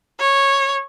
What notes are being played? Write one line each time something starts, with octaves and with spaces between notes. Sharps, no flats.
C#5